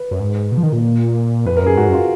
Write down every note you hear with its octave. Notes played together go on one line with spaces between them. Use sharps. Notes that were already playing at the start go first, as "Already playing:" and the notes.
Already playing: B4
F#2
G#2
B2
F3
D#3
A#2
F2 B4
A#4
F#2
G#4
G#2 F#4
F#2
F4